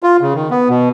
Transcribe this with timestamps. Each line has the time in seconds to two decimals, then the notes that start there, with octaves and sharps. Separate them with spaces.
0.03 F4
0.21 C#3
0.34 D#3
0.51 B3
0.69 B2